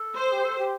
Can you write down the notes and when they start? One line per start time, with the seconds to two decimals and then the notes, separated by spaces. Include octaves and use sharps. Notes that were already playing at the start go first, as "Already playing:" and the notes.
Already playing: A4
0.15 C5
0.32 G4
0.44 A4
0.58 G4